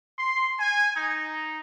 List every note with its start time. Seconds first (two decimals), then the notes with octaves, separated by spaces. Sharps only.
0.19 C6
0.60 G#5
0.97 D#4